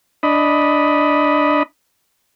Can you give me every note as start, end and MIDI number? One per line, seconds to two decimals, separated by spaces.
0.23 1.63 62
0.23 1.63 75
0.23 1.63 83